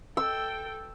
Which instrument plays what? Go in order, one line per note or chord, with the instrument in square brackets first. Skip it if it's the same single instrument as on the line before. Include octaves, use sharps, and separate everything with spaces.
[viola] A4 G5 [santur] E6